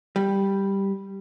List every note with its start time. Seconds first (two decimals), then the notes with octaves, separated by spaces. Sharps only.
0.16 G3